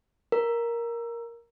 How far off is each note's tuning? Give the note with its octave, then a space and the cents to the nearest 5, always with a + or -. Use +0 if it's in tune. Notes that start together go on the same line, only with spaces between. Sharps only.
A#4 +5